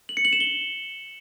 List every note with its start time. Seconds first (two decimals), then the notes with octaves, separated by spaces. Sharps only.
0.09 F#7
0.17 C#7
0.25 F#7
0.33 E7
0.40 G7